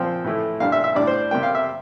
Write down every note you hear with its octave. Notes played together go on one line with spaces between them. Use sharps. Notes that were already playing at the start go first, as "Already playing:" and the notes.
Already playing: A#2 F3 C4 G5
A2 E3 A3 E4
A#2 G3 D4 F5
E5
E5
A2 G3 D4 D5
C5
C3 G3 A#3 G5
F5
E5